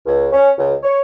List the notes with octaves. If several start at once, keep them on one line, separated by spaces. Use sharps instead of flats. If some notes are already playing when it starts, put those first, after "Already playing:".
C#2
C#4
C#2
C#5